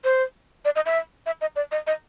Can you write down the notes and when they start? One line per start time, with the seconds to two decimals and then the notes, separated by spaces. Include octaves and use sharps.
0.04 C5
0.65 D5
0.76 D#5
0.86 E5
1.26 E5
1.41 D#5
1.56 D5
1.72 D#5
1.87 D#5